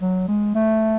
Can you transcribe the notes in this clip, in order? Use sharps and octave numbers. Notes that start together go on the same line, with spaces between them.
F#3
G#3
A3